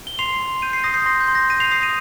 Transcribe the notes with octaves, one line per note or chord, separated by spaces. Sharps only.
G7
C6 C7 F7
C6
G6 D#7
C7
D#6 A#6
G6 C7
C6 A#6
G6
C6
A#6
G6 A#6 D#7
C7 F7
D#6 C7 F7
A#6 D#7